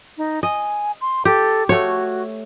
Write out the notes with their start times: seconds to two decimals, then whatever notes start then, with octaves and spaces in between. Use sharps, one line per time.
0.18 D#4
0.43 D#5 G#5
1.01 C6
1.25 G4 A4
1.69 A3 F#4 C#5